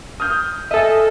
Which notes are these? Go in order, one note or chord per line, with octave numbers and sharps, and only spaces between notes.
D#6 F6 G6
A4 D#5 E5 G#5